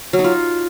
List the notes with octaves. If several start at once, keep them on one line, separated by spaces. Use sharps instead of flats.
F#3
D#4
F4